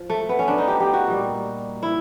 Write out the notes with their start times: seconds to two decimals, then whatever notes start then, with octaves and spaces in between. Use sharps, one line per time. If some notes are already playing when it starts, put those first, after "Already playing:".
Already playing: F3
0.10 A3
0.29 B3
0.39 C#4
0.48 D4
0.58 D#4
0.68 G4
0.80 G4
0.93 F#4
1.07 A#2 G3
1.83 E4